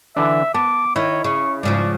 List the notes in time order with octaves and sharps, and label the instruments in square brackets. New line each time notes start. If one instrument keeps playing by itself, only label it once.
[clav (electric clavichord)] D3 E3 D4 [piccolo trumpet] E5
[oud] B3 [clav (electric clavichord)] A5 [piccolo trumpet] D6
[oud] D#3 [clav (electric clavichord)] E4 [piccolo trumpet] C#5
[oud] C#3 [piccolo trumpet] C#6
[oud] G#2 C#3 F3 [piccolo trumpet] D5